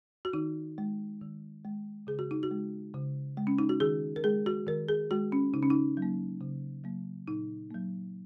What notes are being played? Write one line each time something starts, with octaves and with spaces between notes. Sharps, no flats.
F#4
D#3 D#4
G#3
D#3
G#3
C#3 G#4
F#4
D#4
F#4
G#3
C#3
G#3
C#4
D#4
F#4
D#3 G#4
A#4
G#3 G#4
F#4
D#3 A#4
G#4
G#3 F#4
C#4
C#3 D#4
C#4
D#4
F#3
A#3
C#3
F#3 A#3
A#2 D#4
F#3 A#3